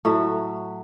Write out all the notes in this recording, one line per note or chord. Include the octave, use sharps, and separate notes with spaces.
A2 F#3 F#4 E5